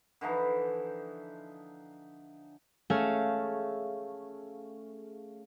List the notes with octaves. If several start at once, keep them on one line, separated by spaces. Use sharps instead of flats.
D3 E3 F3 D#4
A3 C#4 G#4 E5 F5